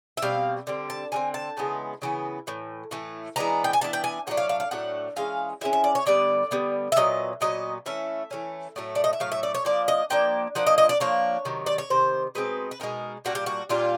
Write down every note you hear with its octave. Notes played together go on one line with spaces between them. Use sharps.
E5
B2 G3 C4 F5
D3 G3 C4
A5
D3 G3 C4 G#5
A5
C#3 E3 G#3 B3
C#3 E3 B3
A2 E3
A2 E3 A3
E3 G#3 B3 D4 A#5
G5
G#5
E3 G#3 B3 D4 A5
G5
G#5
A2 F#3 A3 D4 F#5
F5
F5
F5
A2 F#3 A3 D4 F#5
E3 G#3 C#4 F5
E3 G#3 C#4 E5
E5
D5
C#5
D3 G3 B3 D5
D3 G3 B3
E5
A#2 F#3 B3 D#5
A#2 F#3 B3 D#5
E3 A3 C#4 E5
E3 A3 C#4
A2 F#3 A3
D5
D#5
E5
A2 F#3 A3 F5
E5
D5
C#5
F3 A#3 D4 D5
D#5
F3 A#3 D4 G5
F3 A#3 D4 F#5
D#5
D#5
D5
F3 A#3 D4 C#5
C3 D#3 F#3
D5
C#5
C3 D#3 C5
B2 G#3 C4 D#4 B4
B4
B2 G#3 C4 D#4 A#4
A#2 G3 A#3 D4 F#4
G4
F#4
A#2 G3 A#3 D4 F4